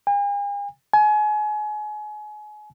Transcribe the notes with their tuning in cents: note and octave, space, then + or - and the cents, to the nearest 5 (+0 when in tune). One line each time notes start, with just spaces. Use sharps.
G#5 -45
G#5 +30